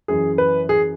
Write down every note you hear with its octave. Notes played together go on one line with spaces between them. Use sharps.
F#2 E3 G#4
B4
G#4